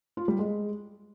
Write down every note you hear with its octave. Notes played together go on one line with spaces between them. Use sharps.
F4
G3
G#3